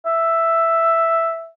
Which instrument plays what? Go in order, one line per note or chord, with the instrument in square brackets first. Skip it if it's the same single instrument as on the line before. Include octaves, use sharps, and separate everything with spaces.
[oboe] E5